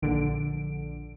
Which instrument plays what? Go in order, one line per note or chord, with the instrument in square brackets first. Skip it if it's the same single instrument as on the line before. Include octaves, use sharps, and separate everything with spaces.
[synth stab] A#1 D3 D7